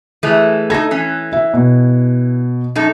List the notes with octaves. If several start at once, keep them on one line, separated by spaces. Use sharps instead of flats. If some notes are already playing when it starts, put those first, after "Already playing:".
E3 G#3 A3
D#4 A4 G#6 A#6
E3 C#4
E5
B2
F#2 D#4 A4